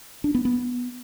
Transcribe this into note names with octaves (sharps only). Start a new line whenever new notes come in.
D4
B3
B3